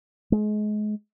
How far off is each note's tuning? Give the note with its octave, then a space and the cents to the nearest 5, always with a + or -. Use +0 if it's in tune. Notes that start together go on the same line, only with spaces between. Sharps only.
G#3 +30